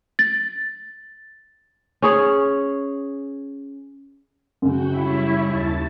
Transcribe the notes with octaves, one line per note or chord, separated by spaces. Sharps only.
A6
C#4 G#4 C#5
F#2 C#3 F#4 G5
G3 E4 C#5 C#6
D#2 A5 A6